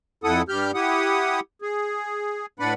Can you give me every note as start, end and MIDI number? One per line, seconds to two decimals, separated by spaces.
0.24 0.42 41
0.24 0.42 64
0.24 0.42 69
0.24 0.42 78
0.24 0.42 87
0.49 0.71 43
0.49 0.71 55
0.49 0.71 67
0.49 0.71 89
0.49 0.71 91
0.74 1.40 64
0.74 1.40 67
0.74 1.40 78
0.74 1.40 87
1.62 2.46 68
2.60 2.74 45
2.60 2.74 62
2.60 2.74 71
2.60 2.74 74
2.60 2.74 78
2.60 2.74 83